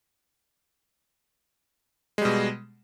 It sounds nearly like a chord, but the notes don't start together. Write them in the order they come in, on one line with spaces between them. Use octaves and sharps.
G#3 G3 B2